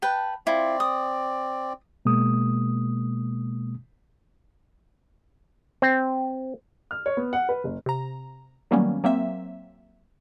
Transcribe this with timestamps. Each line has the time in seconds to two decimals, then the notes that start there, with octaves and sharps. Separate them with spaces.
0.02 B4 G5 A5
0.47 C4 E4 F4 D5
0.80 D#6
2.05 B2 G#3 A#3 D#6
5.82 C4
6.91 F6
7.06 C#5
7.17 B3
7.33 F#5
7.49 B4
7.64 F#1
7.86 C3 A#5
8.71 D#3 F#3 G3 A#3 B3 C#4
9.04 F#3 A#3 C4 E5